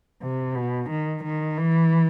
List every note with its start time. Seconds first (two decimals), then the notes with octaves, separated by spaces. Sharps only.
0.22 C3
0.55 B2
0.90 D#3
1.24 D#3
1.58 E3